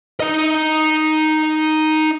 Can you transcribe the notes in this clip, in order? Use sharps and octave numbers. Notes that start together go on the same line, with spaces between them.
D#4 D#5